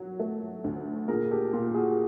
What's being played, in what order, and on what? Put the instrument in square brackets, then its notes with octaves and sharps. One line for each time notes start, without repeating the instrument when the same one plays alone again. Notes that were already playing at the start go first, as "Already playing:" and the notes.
Already playing: [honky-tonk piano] F#3 [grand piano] F#4
[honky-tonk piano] A3
D2
[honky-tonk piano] A#2 [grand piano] G#4 A#4
[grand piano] G4 A4
[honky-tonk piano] A#2 [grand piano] F4 G4
[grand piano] F#4 G#4